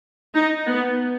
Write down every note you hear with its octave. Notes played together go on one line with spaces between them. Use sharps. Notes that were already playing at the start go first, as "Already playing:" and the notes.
D#4
B3